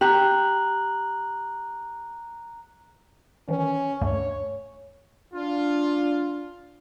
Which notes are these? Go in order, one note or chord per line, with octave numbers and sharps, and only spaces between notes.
G4 A#5 F#6 F#7
D#3 E3 C#4
D2 G2 A3 C#5
D4 F4